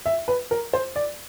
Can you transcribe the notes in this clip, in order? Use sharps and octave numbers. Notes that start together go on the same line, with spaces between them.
E5
B4
A#4
C5
D5